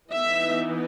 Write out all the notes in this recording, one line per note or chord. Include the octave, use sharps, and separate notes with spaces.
E3 B3 D#4 E5